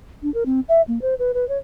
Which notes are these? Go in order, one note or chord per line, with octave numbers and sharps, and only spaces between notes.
D4
A#4
C4
E5
A#3
C5
B4
B4
C#5